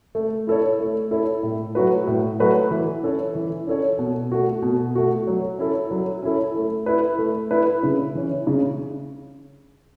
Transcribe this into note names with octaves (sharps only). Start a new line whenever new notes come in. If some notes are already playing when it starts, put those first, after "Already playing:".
A3
E4 A4 C#5
A3
E4 A4 C#5
A2
F#3 A3 F#4 B4
A2
F#3 A3 F#4 B4
E3
C#4 A4 C#5
E3
C#4 A4 C#5
B2
A3 F#4
B2
A3 F#4
F#3
C#4 E4 A4
F#3
C#4 E4 A4
A3
E4 B4
A3
E4 B4
C#3
E3 C#4
C#3